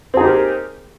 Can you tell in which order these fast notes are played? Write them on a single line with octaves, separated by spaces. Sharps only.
C4 G#4 D#4 G4 A#4